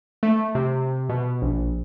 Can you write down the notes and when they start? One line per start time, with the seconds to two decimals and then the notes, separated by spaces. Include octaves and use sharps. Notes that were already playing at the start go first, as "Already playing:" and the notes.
0.23 A3
0.55 C3
1.09 B2
1.42 A#1